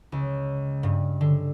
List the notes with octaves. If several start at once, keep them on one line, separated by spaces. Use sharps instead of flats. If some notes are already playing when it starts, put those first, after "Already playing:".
C#2
G2
D3